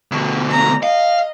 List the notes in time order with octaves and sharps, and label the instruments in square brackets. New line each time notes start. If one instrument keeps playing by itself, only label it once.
[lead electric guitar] D2 B2
[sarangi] A#5
[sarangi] D#5 [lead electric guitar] F5